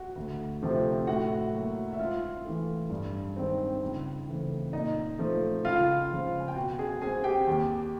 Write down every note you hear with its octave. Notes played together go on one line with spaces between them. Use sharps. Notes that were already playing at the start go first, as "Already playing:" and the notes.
Already playing: F#4 F#5
D2
C3 F3 A3
A2 F#4 F#5
F#3 A#3
E5
G#2 F4 F5
E3 A3
G2
D#3 G#3 C4
C#2
C#3 E3 A3 C4
A#2 D#4 D#5
F3 A3
C#2 F4 F5
C#3 F3 G#3
G#5
G5
B2 F#4 F#5
G#4 G#5
G#3 C4 G#4 G#5
G4 G5
D#2